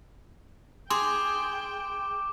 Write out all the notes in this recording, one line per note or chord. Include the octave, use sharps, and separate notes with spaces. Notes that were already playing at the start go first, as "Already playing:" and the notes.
G#4 G5 C6 D6